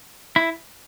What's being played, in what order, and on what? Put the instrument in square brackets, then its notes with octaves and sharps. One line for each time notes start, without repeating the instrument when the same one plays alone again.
[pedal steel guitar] E4